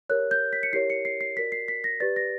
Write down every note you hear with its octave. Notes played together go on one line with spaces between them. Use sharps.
G4 A#4 C#5 F#6
G6
B6
C#7
E4 G4 A#4 C#5 C7
C#7
C7
C7
F#4 A#4 D5 B6
C7
B6
A#6
G4 B4 D5 A6
A#6